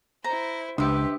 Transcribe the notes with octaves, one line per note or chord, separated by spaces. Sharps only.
E4 C5 A#5
C#2 D4 G4 B4 C5 E5 C6